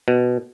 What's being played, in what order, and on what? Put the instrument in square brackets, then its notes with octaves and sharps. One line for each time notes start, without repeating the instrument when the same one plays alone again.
[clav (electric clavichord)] B2